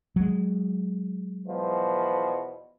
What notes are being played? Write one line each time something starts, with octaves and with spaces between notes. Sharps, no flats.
F#3 G#3
E2 B2 F3